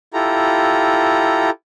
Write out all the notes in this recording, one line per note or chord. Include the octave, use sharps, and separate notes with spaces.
E4 F4 G4 A4 A#5